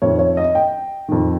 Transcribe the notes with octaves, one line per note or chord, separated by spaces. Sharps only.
F2 D#3 C#5
C#5
D#5
G5
F2 D#3